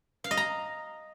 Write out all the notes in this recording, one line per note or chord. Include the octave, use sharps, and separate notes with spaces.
F5
D#5
A#5